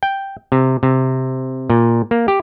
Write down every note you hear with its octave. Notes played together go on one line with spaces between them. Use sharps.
G5
C3
C3
A#2
A#3
G4